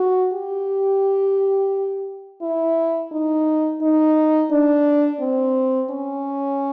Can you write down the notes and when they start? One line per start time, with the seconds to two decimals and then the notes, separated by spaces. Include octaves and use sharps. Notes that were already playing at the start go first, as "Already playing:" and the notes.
Already playing: F#4
0.33 G4
2.42 E4
3.12 D#4
3.81 D#4
4.51 D4
5.21 C4
5.90 C#4